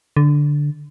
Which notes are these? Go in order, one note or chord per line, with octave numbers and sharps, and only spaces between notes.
D3